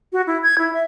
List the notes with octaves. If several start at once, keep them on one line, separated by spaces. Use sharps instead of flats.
F#4
E4
G#6
E4
E5